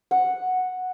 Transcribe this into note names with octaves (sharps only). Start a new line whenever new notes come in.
F#5